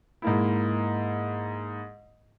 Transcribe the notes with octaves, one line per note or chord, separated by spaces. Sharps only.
G#2 A#3 E4